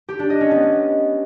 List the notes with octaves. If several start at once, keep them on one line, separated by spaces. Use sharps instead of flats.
G4
D4
D#5
C#4
B3